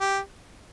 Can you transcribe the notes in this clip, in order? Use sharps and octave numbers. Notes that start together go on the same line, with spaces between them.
G4